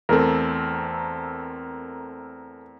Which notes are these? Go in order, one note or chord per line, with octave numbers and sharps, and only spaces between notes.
E2 A3 C4 A4 A#4